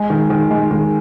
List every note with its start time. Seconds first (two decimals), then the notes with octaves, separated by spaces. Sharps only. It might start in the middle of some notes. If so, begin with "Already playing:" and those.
Already playing: G#3
0.10 D#3
0.30 D#3
0.51 G#3
0.71 D#3